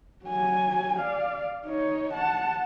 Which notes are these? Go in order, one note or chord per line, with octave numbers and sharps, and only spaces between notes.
F#3 G#5
D5 F5
D#4 C#5
F#5 A5